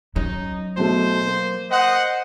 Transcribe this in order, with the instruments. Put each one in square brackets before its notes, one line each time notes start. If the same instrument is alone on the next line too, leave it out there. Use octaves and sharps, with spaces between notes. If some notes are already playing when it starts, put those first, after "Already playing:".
[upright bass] F#3 C#4 [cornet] D#4
[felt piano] B1 B2 A3 [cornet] C5
[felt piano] A#3
[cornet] C5 [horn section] D#5 F#5